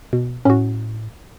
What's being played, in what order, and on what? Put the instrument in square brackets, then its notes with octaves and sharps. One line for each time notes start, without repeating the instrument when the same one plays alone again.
[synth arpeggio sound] B2
[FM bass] A2 [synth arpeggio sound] C#4 F#4